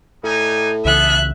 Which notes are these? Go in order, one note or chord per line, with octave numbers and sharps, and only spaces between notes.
A2 G3 D#4 G#5
C2 C#3 E3 B3 G#4 A4 E5 F#6